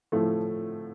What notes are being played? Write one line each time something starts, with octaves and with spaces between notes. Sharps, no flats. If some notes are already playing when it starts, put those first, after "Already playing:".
A2 F3 A3